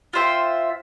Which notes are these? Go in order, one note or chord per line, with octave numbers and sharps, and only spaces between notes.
F4 C5 E5 G5